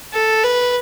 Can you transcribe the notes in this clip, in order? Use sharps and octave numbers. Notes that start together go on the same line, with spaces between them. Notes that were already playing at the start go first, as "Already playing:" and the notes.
A4
B4